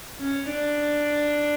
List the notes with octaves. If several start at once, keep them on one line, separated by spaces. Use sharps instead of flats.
C#4
D4